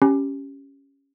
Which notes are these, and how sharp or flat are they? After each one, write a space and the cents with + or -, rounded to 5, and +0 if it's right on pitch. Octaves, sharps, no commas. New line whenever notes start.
C#4 +0 G4 +0 B5 -40